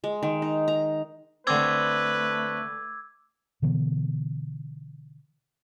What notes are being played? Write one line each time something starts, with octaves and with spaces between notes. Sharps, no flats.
G#3
D#3
D#4
A#5
D3 A3 C4 B4 D6 E6 G#6
B2 D3 E3 B3